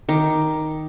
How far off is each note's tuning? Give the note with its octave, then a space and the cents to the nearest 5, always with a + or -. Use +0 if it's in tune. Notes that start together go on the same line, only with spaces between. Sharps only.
D#3 +0 D6 +5